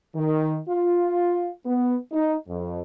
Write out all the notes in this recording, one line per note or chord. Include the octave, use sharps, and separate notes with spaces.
D#3
F4
B3
D#4
F2